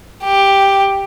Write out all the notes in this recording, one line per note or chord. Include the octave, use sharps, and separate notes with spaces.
G4